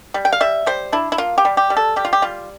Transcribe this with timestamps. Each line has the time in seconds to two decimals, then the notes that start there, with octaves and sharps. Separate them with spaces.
0.14 G3
0.25 G5
0.33 F5
0.41 G3 E5
0.66 G3 C5
0.92 D4 E4
1.12 E4
1.18 A#3 F4
1.38 G4
1.45 G3
1.57 G4
1.70 G3
1.77 A4
1.96 G3 G4
2.05 F4
2.13 G4
2.22 G3 F4